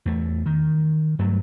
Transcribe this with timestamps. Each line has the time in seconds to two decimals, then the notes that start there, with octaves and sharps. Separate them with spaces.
0.05 E2 A3
0.46 D#3
1.19 G2 F#3 A3